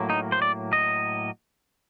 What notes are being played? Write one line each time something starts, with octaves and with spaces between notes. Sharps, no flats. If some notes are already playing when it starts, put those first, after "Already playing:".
Already playing: A2 F#3 A#3
D#4
C5
D5
D#5